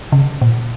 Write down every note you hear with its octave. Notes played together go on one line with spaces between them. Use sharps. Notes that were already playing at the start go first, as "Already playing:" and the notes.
C#3
A#2